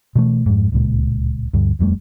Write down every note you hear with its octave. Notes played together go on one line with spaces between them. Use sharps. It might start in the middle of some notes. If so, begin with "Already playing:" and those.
B2 E3 F#3 A3
F2 G#2
D1 C#2 A#2 G#3
D2 G2
D#1 F2 G3 A3